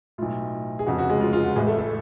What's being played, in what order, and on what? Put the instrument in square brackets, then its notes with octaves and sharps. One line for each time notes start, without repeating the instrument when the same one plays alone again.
[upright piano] B1 A2 F4
G#4
F1 F2 C#3 F#4
F#4
G#3 G#4
F4
F4
F#4
A1 A2 G#3 G#4
A3 A4
A3 A4